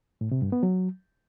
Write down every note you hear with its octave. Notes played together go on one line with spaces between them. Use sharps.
A2
C3
G2
B3
F#3